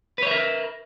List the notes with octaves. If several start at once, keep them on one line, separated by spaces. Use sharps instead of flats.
A#4 B4 C#5 E5